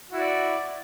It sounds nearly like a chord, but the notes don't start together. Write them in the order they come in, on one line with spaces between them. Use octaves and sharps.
F#4 E4 D5